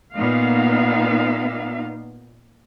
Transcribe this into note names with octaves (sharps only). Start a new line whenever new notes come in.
A#2 B3 D#4 F5